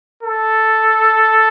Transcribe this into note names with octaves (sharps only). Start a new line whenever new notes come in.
A4